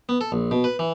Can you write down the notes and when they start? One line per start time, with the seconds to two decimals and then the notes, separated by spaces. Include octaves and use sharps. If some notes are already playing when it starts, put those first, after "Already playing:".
0.09 B3
0.21 A4
0.32 A#1
0.51 B2
0.64 B4
0.79 E3